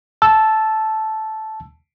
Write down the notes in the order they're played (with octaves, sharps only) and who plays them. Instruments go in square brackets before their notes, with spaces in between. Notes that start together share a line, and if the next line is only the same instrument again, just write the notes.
[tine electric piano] A5 E6